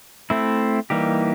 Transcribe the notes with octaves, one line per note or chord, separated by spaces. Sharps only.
A3 C4 E4
E3 G3 A#3 D#4 G4